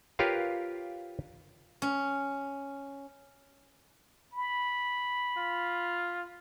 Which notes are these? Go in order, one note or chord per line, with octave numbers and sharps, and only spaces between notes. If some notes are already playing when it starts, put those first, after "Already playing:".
F4 G4 A#4 B4 C#5 F5
C#4
B5
F4